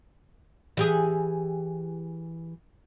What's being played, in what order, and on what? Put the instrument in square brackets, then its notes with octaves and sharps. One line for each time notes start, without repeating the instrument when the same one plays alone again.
[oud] E3 G4 G#4